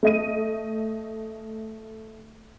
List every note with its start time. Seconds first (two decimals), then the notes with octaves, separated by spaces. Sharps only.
0.03 A3 D#5 D#7